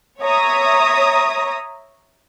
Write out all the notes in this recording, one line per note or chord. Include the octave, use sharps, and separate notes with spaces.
C#5 E5 A#5 D#6